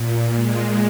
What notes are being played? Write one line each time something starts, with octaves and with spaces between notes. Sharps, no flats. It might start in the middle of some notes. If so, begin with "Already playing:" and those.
Already playing: A#2
G#3